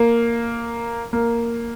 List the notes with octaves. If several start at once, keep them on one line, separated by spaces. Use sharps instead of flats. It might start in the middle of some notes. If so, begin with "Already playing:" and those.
Already playing: A#3
A#3